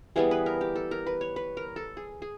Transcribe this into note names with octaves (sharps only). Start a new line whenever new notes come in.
E3 G3 B3 G#4
B4
A#4
G4
A4
A#4
B4
C#5
B4
A#4
A4
G#4
G#4